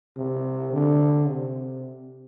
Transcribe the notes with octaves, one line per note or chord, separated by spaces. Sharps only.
C3
D3
C3